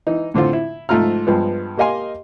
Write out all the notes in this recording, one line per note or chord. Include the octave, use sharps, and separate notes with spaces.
E3 D#4
A2 D3 C4 F4
E4
G#2 F3 A3 F4 A#5 F6
G2 F3 G#3 B3
A#3 G4 D#5 F5 G#5 C6